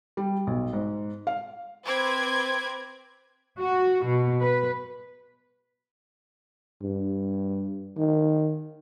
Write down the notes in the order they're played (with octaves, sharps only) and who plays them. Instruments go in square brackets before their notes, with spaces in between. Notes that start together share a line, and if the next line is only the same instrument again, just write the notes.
[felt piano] G3
B1
G#2
F5
[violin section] C4 B4 D6 G#6
[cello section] F#4
B2
B4
[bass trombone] G2
D#3